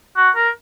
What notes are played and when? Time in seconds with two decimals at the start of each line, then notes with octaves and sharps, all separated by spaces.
0.17 F#4
0.36 A#4